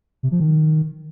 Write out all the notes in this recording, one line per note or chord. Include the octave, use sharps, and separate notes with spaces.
C3
F3
D#3